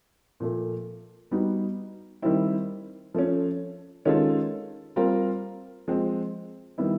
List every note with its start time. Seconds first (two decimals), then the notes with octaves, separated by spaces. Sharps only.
0.40 A#2 F3 A3
1.31 G3 B3 D#4 F#4
2.22 D#3 G3 C4 E4
3.14 F3 A3 C#4
4.05 D#3 G#3 C#4 F4 A4
4.96 G3 C4 F4 A#4
5.88 F3 G#3 C4
6.78 D#3 G3 B3 E4